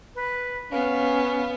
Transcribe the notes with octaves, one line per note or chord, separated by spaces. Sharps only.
B4
B3 C#4 F5